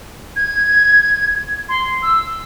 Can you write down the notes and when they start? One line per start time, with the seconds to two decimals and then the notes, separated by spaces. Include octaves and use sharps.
0.36 G#6
1.69 C6
2.03 E6